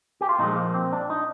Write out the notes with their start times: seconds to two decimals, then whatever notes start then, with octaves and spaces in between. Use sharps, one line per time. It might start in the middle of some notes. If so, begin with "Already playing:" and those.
0.21 G4
0.29 F4
0.39 A#2 F3 G#3 D#4
0.56 A#3
0.74 C4
0.92 D4
1.10 D#4